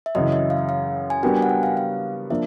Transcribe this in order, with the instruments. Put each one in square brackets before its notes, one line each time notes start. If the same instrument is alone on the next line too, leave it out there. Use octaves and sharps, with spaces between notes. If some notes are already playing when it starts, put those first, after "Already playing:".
[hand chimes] E5
[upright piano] F#2 C#3 E3 [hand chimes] D#5
[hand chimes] E5
F5
F5
G#5
[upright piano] G3 B3 D4 F#4 A#4 [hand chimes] G5
[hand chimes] G#5
F#5
G5
F5
F5
[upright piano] F3 A#3 D4 [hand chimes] E5